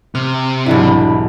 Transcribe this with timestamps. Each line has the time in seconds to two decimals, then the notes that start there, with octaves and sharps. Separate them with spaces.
0.15 C3 F6
0.66 B1 E2 G#2 G3 D4 E4